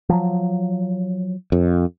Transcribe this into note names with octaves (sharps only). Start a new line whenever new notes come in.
F3 F#3
F2